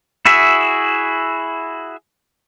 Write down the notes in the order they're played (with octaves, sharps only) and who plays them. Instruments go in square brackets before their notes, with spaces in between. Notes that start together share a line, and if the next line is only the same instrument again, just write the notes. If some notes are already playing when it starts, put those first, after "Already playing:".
[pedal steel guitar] E4 F#4 G#4 E5